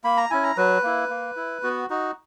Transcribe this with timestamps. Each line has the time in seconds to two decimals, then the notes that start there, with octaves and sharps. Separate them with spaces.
0.04 A#3 B5
0.17 A#5
0.31 C#4 E4 G#5
0.43 A#5
0.57 F#3 B4
0.83 A#3 E4
1.10 A#3
1.37 E4
1.63 B3 F#4
1.90 D#4 F#4